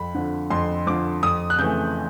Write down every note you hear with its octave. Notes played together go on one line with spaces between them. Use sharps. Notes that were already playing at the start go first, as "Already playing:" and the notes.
Already playing: F2 B5
D3 F3
F2 C6
D3 F3 D6
F2 D#6
F#6
C#3 E3 A3 G6